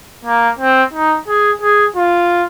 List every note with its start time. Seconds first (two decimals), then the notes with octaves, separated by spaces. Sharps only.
0.25 A#3
0.59 C4
0.93 D#4
1.27 G#4
1.61 G#4
1.96 F4